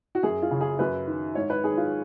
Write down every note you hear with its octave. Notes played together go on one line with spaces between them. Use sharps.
F#4
F#2 G#4
F4
C#3
G#4
F#2 B4
D#3
G#2 C#5
B4
D#3 G#4
F4